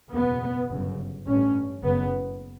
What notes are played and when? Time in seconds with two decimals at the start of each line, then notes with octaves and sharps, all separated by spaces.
0.13 F#1 E2 B2 B3
0.70 G1 F#2 C#3
1.27 A1 G2 C#4
1.83 F#1 F#2 C#3 B3